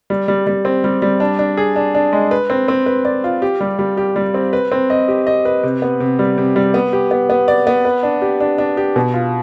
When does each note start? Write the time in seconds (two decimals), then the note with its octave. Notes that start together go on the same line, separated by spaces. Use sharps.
0.10 G3
0.28 G3
0.47 G3
0.65 C4
0.84 G3
1.02 G3
1.20 D4
1.39 D4
1.57 G#4
1.76 D4
1.95 D4
2.13 G#3
2.31 B4
2.50 C4
2.68 C4
2.86 B4
3.05 D5
3.24 F4
3.42 G4
3.61 G3
3.79 G3
3.97 G4
4.16 G3
4.34 C4
4.53 B4
4.72 C4
4.90 D#5
5.08 G4
5.27 D#5
5.45 B4
5.63 C3
5.82 B3
6.00 C3
6.19 G3
6.38 C3
6.56 G3
6.74 B3
6.93 G4
7.11 B3
7.30 B3
7.48 D5
7.67 B3
7.85 B4
8.03 D4
8.22 G4
8.40 D4
8.58 D4
8.77 G4
8.96 B2
9.14 F4